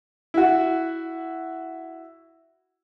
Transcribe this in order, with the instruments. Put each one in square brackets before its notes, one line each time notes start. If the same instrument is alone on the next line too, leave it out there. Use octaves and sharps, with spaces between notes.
[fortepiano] E4 F#4